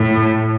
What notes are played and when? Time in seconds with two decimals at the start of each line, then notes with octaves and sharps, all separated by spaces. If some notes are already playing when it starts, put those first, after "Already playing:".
Already playing: A2